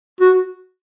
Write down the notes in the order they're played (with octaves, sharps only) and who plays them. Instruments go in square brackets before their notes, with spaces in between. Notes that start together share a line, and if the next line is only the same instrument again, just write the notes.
[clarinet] F#4